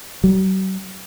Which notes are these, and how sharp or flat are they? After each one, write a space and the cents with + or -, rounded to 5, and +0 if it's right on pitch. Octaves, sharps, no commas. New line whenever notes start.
F#3 +45